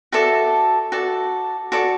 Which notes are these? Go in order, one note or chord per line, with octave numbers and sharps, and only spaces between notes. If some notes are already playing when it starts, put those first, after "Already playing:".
F#4 A4 D5 E5
F#4 A4 D5
F#4 A4 D5